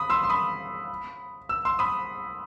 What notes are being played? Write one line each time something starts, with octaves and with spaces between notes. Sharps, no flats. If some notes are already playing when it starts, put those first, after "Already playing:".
Already playing: B5 D#6
C6 E6
C6
B5 D#6
E6
C6 E6
B5 D#6